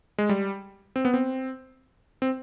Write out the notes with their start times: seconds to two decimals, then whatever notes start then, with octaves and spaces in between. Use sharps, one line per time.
0.18 G#3
0.29 G3
0.96 C4
1.05 B3
1.14 C4
2.22 C4